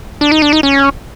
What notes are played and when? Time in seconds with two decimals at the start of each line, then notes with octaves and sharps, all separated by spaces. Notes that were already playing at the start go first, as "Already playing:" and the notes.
0.21 D4
0.32 D#4
0.42 D4
0.53 D#4
0.63 C#4